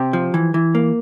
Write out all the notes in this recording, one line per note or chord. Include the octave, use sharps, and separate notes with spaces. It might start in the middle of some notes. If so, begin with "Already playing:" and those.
Already playing: C3 G4
F3
E3
E3
A#3